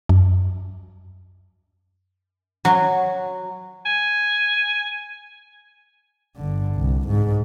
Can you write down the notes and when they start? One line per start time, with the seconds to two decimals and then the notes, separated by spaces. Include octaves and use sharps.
0.09 F#2
2.65 F#3
3.85 G#5
6.36 G1 D3
6.75 C2
7.08 G#2